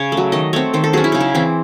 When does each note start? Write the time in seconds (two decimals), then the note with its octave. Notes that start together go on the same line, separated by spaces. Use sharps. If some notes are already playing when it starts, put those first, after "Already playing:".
Already playing: C#3 C#5
0.12 A3
0.17 F#3
0.32 D#3 D#5
0.53 A3 C4 C#5
0.74 D#3 C5
0.84 A4
0.93 F#3 C#4 G#4
1.04 E4
1.12 C#3 D#4
1.21 E4
1.35 E3 C4